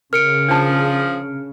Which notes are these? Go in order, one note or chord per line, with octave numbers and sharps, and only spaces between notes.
C#3 A#4 F6 C#7 D7
F3 D4 G#4 A5